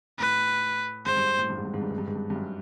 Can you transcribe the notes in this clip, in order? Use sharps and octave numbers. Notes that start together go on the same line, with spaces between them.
A2 B4
G#2 C5
G2
A2
G2
G#2
G2
G#2
G2
G#2
G2
G#2
G2
G2
F#2